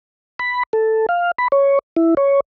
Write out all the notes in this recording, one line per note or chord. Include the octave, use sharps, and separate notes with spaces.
B5
A4
F5
B5
C#5
E4
C#5